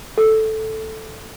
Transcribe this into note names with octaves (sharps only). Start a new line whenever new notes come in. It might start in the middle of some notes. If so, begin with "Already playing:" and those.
A4